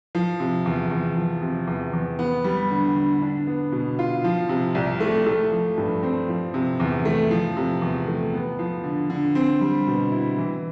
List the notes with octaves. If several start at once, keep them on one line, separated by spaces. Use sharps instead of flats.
F3
C3
E2
E2
F3
C3
E2
E2
B3
G3
D3
D3
D4
B3
B2
F4
F3
C3
C2
A3
A3
F3
G2
C4
F3
C3
E2
A3
F3
C3
E2
A3
B3
F3
D3
D3
C4
G3
B2
E4
E3